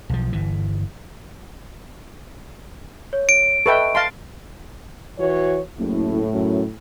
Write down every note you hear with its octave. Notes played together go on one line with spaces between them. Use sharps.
B1 F3
G1 E3
C#5
D7
A4 B4 D#5 E5 G5 C#6
F5 A5 C6
E3 F#4 C#5
F#1 A2
F#2